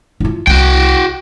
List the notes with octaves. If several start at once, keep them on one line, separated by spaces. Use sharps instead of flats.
D#4 F4
C2 F#4 G5